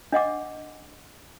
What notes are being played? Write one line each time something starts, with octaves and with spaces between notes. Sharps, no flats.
D4 D#5 F#5 D6